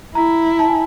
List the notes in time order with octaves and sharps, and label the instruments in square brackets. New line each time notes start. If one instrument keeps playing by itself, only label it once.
[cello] E4 [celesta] A#5
[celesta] A5
G#5